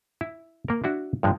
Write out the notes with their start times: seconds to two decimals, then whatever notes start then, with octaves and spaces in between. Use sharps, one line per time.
0.21 E4
0.68 A#3 A#4
0.84 D4 E4 F#4
1.23 G2 F3 G#3